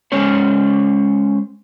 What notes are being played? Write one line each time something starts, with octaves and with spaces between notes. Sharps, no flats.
G#3 C#4 C5 C#5